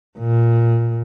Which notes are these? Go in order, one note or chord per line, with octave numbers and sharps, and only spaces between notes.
A#2